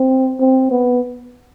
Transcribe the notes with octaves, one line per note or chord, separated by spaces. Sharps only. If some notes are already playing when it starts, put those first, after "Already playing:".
Already playing: C4
C4
B3